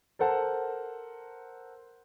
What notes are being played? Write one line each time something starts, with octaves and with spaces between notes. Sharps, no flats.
A4 A#4 C5 F#5 A5